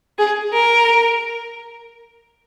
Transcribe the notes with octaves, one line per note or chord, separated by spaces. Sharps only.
G#4
A#4